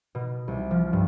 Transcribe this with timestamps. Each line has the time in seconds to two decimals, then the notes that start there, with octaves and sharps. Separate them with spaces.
0.15 B2
0.48 C2
0.71 F3
0.93 G2